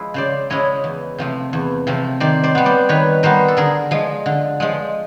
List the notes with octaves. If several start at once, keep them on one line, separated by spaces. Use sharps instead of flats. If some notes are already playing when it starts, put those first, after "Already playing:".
Already playing: F3 G#3 E4
C#3 C5 D5
F3 G#3 C#4 E4 C#5 D#5
E2
C3 F3 A3
E2
C3 F3 A3
D#3 C5 D5
C5 D5
G3 B3
C5 D5
D#3 B4 C#5
G3 B3 A#4 C5
A4
D3 G#4 A#4
F3 G#3
D3
F3 G#3